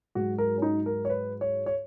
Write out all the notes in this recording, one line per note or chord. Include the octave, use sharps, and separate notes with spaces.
G#2 F#3 F#4
A#4
C#4
D#4
A#4
C#5
B4
C#5
C#5